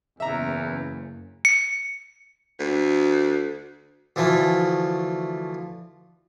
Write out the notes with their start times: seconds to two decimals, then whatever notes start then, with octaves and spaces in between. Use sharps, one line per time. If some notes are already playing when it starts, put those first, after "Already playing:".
0.20 F#1 E2 E5 A#5
1.45 C#7
2.60 D2
4.16 D2 E3 F3 A3